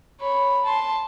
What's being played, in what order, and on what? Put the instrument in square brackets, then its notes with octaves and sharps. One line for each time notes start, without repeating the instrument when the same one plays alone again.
[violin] C#5 B5
A5 C6